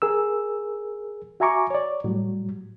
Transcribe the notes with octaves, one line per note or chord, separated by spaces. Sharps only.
G#4 A#4 E6
F#4 E5 G#5 A#5 C#6 D6
C#5 D5
A2 F#3 G3